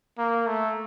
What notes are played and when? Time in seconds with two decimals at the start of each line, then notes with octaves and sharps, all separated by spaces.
0.18 A#3
0.47 A3